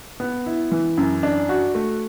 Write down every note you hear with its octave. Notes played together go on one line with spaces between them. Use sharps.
B3
E4
E3
F#2
D4
F#4
A3